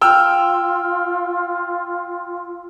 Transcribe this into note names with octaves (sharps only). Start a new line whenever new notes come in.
F4 G5 E6 F6